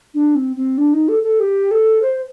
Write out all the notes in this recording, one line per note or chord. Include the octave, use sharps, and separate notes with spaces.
D4
C4
C4
D4
D#4
A4
A4
G4
A4
C5